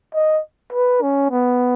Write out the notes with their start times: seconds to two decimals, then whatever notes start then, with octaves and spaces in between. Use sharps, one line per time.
0.14 D#5
0.73 B4
1.02 C#4
1.31 B3